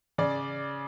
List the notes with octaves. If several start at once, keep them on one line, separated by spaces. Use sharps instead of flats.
C#3 D5